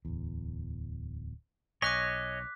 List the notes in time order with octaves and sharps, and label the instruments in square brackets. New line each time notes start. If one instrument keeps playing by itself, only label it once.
[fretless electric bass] D1 E2
[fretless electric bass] B1 [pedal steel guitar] C#5 D#5 G#5 [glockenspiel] D6 F#6 B6